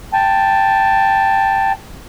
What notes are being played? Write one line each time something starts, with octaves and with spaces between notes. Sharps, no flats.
G5 A5